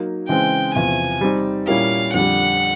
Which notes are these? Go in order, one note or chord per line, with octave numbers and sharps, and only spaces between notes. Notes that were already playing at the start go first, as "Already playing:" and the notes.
Already playing: F#3 A#3 D#4
C#3 E3 G#3 C4 G5
E2 C3 F3 G#5
G3 C4 D#4
A#2 G3 A#3 C#4 E4 F5
F2 D3 G3 F#5